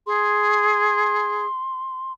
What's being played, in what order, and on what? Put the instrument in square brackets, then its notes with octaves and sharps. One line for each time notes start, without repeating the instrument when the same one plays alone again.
[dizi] G#4 [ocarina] C6